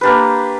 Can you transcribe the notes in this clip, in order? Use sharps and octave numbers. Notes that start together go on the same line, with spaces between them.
A#3 D4 G4 B4